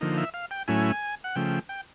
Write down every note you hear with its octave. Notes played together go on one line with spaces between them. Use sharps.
D3 F3 A#3 D#4
E5
F5
G5
A2 F#3 A3 C#4 E4 G#5
F#5
C#3 F3 A3 G5
G5